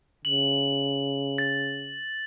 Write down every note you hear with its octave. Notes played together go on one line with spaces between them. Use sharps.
C#3 F#7
A6